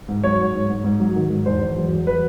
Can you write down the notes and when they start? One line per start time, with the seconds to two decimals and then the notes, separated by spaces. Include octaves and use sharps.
0.08 G#2
0.24 F#3 C#5
0.39 G#2
0.54 G#2
0.69 G#2
0.84 G#2
1.00 F#3
1.16 D#3
1.30 G#2
1.46 E2 C5
1.61 E2
1.77 F#3
1.92 E2
2.07 F#3 B4